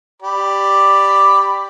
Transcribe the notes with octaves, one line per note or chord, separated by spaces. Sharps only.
G4 D5 B5